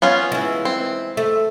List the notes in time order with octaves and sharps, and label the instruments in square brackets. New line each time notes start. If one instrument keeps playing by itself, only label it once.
[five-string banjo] B3 C#4 F4
[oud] E3 G#3
[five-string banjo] C4
[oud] A3